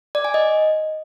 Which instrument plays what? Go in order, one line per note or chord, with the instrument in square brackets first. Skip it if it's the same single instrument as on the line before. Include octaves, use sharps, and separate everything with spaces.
[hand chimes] D5
G#5
D#5